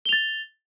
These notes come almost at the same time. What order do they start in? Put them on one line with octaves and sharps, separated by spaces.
G7 F7 A6